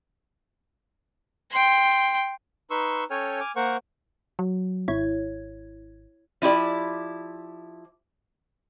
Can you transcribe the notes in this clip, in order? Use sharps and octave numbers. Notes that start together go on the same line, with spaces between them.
G5 C6
D#4 B4 C6 C#6 E6
C#4 A4 C#5 G5 G#5 F6
G#5 D6 F6
A#3 A#4 C5 F#5 C#6
F#3
G#1 E4 C#5 G#6
F3 E4 G4 D5